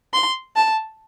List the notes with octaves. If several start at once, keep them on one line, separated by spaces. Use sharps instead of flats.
C6
A5